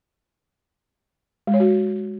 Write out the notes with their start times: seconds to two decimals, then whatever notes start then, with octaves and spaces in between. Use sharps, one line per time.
1.47 G#3
1.54 C#5
1.60 F#4